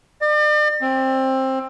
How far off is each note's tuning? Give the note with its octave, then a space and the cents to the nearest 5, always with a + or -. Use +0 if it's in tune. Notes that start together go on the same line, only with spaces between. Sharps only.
D5 +40
C4 +15